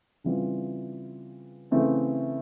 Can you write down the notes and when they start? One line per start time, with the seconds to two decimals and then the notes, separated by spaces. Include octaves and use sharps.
0.24 C#3 E3 G3 C4 F4
1.71 C#3 E3 A3 C4 E4